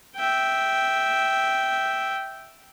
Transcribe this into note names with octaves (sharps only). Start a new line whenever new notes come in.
E5 G5